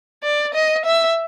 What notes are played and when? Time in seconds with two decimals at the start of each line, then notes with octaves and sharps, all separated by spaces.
0.24 D5
0.54 D#5
0.85 E5